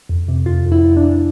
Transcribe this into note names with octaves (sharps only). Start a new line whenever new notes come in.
F2
C3
F2 F4
F2
E4
E3
D4
E3